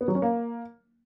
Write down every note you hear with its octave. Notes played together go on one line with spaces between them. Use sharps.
B3
F#3
C#4
A#3